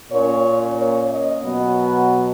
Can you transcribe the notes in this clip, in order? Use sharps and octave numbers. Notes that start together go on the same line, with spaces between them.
A#2 A#3 C#4 C#5
C#5
D#5
B2 F#3 B3